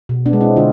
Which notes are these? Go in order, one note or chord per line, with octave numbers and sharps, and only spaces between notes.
B2
B3 D4
G#3
C4 E4
D3 D4 F4